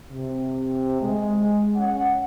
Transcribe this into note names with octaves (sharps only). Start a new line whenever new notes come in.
C3
G#3
C#4 F#5